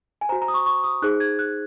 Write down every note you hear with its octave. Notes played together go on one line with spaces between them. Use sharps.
G#5
F#4 C5 A#5
A#5
D#6
C#6
C#6
D#6
D#4 G#4 C5 F#6
G#6
F#6